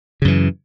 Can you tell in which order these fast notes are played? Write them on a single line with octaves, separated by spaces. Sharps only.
C#3 F#2 E3